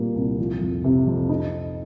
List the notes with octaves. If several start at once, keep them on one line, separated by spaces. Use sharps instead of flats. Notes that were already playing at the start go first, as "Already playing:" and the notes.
Already playing: A#2 G3 A#3
C2
F3
F2
C3
F2
D#4